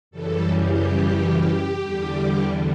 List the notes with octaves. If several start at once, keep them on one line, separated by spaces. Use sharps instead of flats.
F#2 C#3 E3 G3 A4
G4
E2 D3 G3